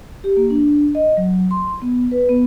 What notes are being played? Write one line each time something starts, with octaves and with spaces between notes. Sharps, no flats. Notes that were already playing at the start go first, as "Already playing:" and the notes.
G4
A#3
D4
D#5
F#3
C6
B3
B4
B3